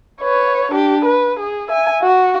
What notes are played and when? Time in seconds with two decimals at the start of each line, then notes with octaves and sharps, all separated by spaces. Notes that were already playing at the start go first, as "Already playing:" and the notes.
0.21 B4 C#5
0.72 D4 G4
1.05 B4
1.40 G#4
1.69 E5 G#5
2.02 F#4